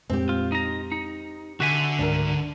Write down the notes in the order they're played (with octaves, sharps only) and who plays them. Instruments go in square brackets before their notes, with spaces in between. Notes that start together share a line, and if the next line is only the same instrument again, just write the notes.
[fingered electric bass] F2 A#2 G#3 [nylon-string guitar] C4 G4
[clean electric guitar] F4
D#4 A#5
D#4
[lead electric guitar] D3 [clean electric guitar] F#4 E5 G#5
[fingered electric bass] C#2 G#2 [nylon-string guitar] D4 A#4